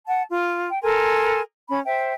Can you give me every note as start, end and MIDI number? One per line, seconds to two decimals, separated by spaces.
0.06 0.23 78
0.06 0.23 81
0.29 0.68 65
0.70 0.81 79
0.83 1.41 69
0.83 1.41 70
0.83 1.41 80
0.83 1.41 84
1.69 1.79 61
1.69 1.79 83
1.85 2.14 72
1.85 2.14 76
1.85 2.14 79